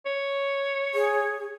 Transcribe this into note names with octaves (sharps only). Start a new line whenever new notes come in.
C#5
G#4